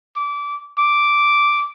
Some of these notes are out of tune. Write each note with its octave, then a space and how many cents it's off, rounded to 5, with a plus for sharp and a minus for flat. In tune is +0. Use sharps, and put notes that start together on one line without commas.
D6 -20
D6 -5